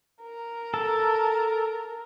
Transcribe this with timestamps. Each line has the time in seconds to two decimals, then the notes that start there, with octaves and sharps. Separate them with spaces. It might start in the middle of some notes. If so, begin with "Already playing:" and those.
0.22 A#4
0.74 A4